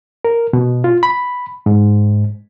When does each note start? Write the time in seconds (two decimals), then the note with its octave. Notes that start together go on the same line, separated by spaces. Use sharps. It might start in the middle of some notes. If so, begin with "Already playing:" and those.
0.25 A#4
0.53 B2
0.84 F4
1.03 B5
1.66 G#2